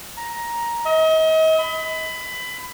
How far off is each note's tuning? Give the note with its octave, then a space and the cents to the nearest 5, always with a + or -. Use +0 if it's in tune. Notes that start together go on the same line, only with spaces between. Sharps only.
A#5 +10
D#5 +40
B5 +20